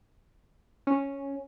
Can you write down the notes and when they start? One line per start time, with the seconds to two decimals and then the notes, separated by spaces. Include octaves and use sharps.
0.87 C#4